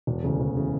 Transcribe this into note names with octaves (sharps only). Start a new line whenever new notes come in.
E1
D2 C#3 E3
E1
C#3 E3